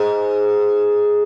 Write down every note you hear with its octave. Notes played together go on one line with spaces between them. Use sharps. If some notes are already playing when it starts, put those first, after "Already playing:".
Already playing: G#2